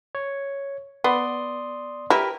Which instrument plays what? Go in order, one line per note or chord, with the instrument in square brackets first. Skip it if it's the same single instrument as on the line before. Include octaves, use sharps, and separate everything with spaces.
[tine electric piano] C#5
[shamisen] B3 [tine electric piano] D5 C6 D#6
[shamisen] E4 [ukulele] G4 A#4 B4